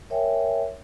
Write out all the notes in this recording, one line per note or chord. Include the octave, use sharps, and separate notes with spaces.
A#4 C#5 E5 G5 G#5